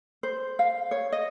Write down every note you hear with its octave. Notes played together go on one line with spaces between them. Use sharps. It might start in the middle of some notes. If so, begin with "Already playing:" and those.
C5
F5
C#5
D#5